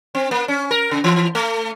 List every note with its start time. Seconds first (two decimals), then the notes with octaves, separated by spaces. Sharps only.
0.15 C4
0.31 A#3
0.48 C#4
0.71 A#4
0.91 C#3
1.04 E3
1.35 A3